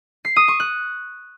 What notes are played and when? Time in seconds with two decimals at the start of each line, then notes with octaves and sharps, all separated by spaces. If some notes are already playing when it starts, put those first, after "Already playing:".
0.25 C7
0.36 D#6
0.48 C#6
0.60 F#6